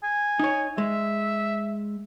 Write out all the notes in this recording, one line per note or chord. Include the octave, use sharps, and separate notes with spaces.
G#5
D#4 C#5
G#3 E5